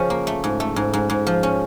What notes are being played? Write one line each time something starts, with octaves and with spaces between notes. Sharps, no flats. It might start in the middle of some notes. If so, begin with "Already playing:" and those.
Already playing: C#3 F3 C#4
A#3
A3
G#2
A3
G#2
G#2
G#2
F3
C#4